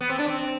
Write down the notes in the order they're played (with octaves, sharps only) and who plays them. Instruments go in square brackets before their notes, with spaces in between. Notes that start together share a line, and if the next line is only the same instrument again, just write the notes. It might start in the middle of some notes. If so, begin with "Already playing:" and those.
[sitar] B3
C4
D4
C4